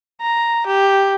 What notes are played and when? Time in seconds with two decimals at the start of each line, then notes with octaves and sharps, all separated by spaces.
0.21 A#5
0.67 G4